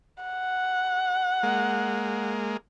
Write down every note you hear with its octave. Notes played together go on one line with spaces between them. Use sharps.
F#5
G#3 A#3